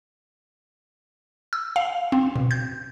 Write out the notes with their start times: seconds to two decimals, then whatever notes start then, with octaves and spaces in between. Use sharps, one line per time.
1.53 E6
1.76 F5
2.12 C4
2.36 B2
2.51 G6